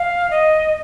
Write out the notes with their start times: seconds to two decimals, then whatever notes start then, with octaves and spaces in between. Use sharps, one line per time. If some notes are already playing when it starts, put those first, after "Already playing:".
Already playing: F5
0.31 D#5